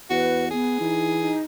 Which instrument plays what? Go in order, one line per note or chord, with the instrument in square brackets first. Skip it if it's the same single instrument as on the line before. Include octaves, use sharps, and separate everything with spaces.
[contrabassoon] E2 [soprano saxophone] F#4 [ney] B4
[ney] B3 [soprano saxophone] G#4
[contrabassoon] E3 [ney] D#4
[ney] D#4